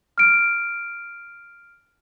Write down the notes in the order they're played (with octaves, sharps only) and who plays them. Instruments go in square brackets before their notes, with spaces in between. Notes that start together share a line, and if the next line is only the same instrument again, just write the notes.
[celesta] F6 D7